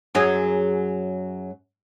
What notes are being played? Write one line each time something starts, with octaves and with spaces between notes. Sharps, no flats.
F#2 F#3 G#4